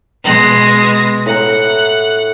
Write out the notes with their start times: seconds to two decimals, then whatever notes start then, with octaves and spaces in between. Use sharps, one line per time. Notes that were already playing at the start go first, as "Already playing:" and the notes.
0.24 B2 G#3 A#6
1.26 A2 F#5 A#5